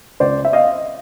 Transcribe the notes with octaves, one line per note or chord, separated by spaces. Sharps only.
C#2 C5 D5
E5
D#5 F5